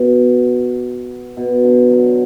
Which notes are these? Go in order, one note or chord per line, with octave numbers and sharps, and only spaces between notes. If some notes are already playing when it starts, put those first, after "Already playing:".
Already playing: B2
B2
D3
F#3